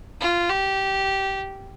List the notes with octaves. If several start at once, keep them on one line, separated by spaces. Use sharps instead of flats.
F4
G4